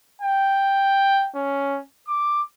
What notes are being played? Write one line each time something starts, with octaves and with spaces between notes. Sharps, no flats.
G5
C#4
D6